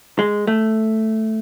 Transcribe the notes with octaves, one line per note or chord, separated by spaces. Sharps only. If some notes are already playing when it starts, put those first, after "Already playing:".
G#3
A3